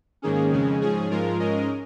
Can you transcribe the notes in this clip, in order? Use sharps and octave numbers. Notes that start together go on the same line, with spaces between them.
G#2 D#3 A#3 C#4 G#4
F2 C#3 G#3 C#4
G#2 F3 C#4 G#4
G#2 F3 G#3 F4 A#4
G#2 G#3 C#4 A#4 D#5